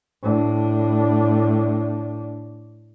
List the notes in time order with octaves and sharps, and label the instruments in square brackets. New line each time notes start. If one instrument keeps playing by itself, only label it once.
[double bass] A2 D4